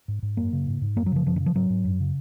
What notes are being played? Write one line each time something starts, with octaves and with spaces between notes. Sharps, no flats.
G#2
G#2
F#2 A#3
C#3
G#2
G#2
F#2 A#3
F#3
C#3 F3
F#2 F3
D#3
C#3
F3
G#2 F#3
G#2
F#2
C#3